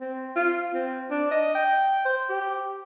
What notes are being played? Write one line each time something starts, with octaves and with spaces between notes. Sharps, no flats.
C4
F4
C4
D4
D#5
G5
C5
G4